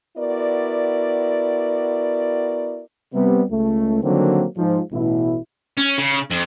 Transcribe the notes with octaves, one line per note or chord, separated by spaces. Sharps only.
B3 E4 F#4 A#4 D5
C3 G3 B3
C#2 A3
D3 D#3 F#3 G3 A#3 C4
G#2 F3
A1 B2 E4
C#4
C#3
F2